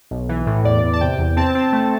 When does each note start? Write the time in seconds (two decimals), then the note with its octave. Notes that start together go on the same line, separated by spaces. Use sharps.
0.11 B1
0.29 E3
0.46 A2
0.64 E2 D5
0.83 E2
0.93 A5
1.01 C3 G5
1.19 E2
1.36 C4 A5
1.55 C4
1.72 A3